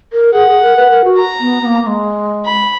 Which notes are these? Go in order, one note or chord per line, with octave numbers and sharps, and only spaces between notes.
A#4
G#4 F#5
G#4
A#4
B4
A#4
F#4
A#5
B3
B3
A#3
A#3
G#3
B5